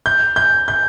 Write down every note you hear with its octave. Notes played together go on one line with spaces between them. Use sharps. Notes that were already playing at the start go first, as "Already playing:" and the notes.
G6
G6
G6